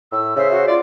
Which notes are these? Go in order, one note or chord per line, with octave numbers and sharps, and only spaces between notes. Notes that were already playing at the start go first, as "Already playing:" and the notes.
A2 E6
C#3 C5 E5
F#4 E5
F4 D5